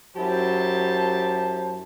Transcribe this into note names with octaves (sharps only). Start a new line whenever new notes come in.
F#2 F#3 E4 G4 C5 A5